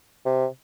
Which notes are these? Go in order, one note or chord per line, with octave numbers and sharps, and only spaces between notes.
C3